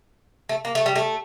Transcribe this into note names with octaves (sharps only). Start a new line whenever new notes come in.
A3
A#3
A3
G3
A3